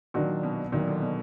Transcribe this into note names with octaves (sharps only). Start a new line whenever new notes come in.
A#2 D#3 F#3 D4 F#4
B2
A#2 D#3 F#3 D4 F#4
D3
B2